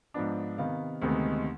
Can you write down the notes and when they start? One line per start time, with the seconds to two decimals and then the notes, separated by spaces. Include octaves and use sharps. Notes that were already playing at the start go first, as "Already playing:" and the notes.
0.14 G#2 F3 B3 D4
0.58 C3 D#3 B3 F5
1.02 D2 C3 D#3 G#3 B3